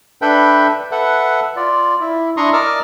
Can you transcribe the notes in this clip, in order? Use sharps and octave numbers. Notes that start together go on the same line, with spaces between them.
D4 A4 B4 E5 G5 B5
A4 B4 E5 F#5
F4 D5
E4
D4 E4 A#5 C6 C#6 D#6
A#4 D5 D#5 D6 E6 F6